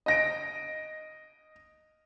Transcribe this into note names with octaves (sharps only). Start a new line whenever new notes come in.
D#5 A#6 D7